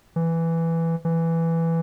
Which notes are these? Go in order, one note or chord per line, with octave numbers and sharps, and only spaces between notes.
E3
E3